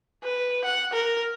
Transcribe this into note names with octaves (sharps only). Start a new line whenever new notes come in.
B4
F#5
A#4